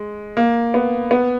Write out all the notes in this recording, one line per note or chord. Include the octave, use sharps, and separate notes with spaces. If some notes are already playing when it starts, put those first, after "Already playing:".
Already playing: G#3
A#3
B3
B3